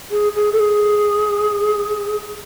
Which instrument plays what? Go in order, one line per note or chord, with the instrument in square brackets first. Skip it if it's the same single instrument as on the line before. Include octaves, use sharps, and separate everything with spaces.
[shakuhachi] G#4
G#4
A4
G#4